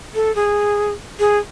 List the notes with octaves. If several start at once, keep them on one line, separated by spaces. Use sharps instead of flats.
A4
G#4
G#4